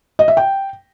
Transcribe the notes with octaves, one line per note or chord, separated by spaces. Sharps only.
D#5
E5
G5